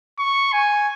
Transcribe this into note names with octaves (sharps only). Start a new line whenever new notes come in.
C#6
G#5